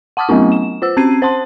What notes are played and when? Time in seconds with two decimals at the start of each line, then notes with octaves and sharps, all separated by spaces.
0.17 F#5 A5 D6 D#6 F6
0.29 F#3 A3 B3 C#4 E4
0.52 E7
0.82 F4 C5 E6
0.97 C4 C#4 G#6 C7 D#7
1.22 C5 A5 C6